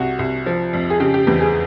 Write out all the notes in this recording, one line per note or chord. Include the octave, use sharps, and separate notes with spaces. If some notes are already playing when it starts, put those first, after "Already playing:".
Already playing: C2 F#4
C2
F3
F2
G#4
C#3 G4
G4
E2 G4
G#4